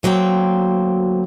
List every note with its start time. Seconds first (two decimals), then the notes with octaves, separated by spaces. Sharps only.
0.03 D2 F#3 A#3 C4 G5